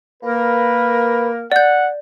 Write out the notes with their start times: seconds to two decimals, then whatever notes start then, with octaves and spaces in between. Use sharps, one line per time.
0.23 A#3 A#4 B4
1.52 D5 F#5 G6